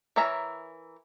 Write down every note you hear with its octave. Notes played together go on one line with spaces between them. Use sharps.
E3 A#4 C#5 E5 A#5